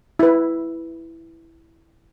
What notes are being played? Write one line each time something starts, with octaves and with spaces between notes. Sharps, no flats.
E4 B4